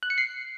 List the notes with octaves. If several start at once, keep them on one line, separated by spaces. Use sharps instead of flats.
F#6
C#7
C7